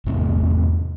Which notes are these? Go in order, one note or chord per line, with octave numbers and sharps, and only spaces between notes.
E2 G#2 C3 A3